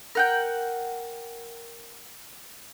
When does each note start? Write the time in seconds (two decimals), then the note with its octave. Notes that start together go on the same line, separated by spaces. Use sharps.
0.15 A#4 F#5 G5